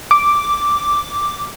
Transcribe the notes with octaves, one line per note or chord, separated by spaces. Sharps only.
D6